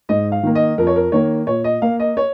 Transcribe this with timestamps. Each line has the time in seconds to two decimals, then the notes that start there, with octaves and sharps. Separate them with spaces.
0.09 G#2 D#5
0.32 F5
0.43 D#3 A#3
0.55 D#5
0.78 F2 A#4
0.87 C#5
0.96 A#4
1.12 D#3 A#3 C#5
1.47 A#2 C#5
1.64 D#5
1.82 A#3 F5
2.00 D#5
2.17 C#5